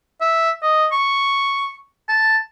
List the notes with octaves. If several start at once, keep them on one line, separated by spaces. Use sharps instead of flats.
E5
D#5
C#6
A5